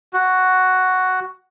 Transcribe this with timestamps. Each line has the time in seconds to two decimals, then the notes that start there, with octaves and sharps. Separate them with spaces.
0.13 F#4